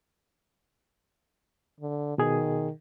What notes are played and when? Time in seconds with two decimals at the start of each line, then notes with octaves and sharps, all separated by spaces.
1.80 D3
2.18 B2 D#3 G#4